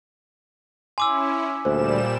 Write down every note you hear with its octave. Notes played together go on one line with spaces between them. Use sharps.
C#4 E4 G#5 C6 D6 E6
D2 A#2 G3 A#3 C5 E7